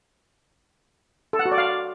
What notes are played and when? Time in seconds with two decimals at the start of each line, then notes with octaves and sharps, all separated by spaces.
1.33 A4
1.39 F#5
1.45 F#4
1.52 D5
1.58 F5